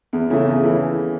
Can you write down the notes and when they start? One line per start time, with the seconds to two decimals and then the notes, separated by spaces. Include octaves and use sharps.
0.13 E2
0.30 C#3 E3 A3
0.46 E2
0.63 C#3 E3 A3